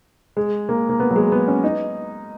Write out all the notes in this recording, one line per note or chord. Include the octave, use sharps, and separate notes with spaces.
G#3
A#3
A#3
B3
F#3
G#3
B3
C#4
D#4